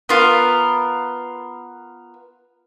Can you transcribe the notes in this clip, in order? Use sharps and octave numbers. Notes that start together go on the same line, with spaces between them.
B3 F4 A#4